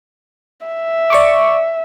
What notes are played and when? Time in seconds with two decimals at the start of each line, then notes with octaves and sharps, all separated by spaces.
0.66 E5
1.10 D5 C#6 D6